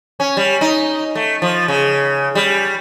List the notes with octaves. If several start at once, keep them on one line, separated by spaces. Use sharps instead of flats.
C#4
G3
D#4
A3
F3
C#3
G3